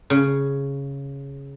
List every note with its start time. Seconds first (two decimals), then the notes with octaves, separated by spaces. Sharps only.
0.10 C#3